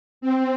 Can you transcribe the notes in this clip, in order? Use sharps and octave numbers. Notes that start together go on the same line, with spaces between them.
C4